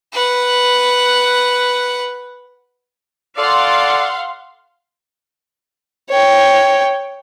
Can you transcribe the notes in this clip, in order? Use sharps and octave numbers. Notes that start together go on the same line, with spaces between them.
B4 F#5
F4 A4 D5 F5 F#5 C6
C#5 G5